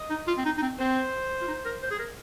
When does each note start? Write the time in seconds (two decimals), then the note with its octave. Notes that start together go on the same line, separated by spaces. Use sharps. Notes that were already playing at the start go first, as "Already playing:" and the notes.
Already playing: D#5
0.10 D#4
0.27 F4
0.38 C4
0.45 D#4
0.58 D#4
0.62 C4
0.78 C4 C5
1.41 F4
1.47 D#4
1.65 A#4
1.82 C5
1.91 G#4
1.99 A#4